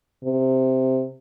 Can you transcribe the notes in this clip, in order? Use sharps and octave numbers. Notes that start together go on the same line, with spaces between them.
C3